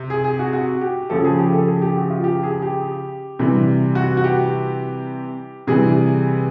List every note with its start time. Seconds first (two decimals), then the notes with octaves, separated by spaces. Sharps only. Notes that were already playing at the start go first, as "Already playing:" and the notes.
Already playing: C3
0.10 G#4
0.24 G#4
0.39 F#4
0.53 F#4
0.81 G4
1.10 C#3 F3 A4
1.25 G#4
1.39 G4
1.53 A4
1.68 G#4
1.82 G4
1.96 F#4
2.10 F4
2.24 G4
2.43 G#4
2.62 G4
3.39 C3 E3 G3
3.95 F#4
4.17 F#4
4.24 G4
5.67 C3 E3 G3 G#4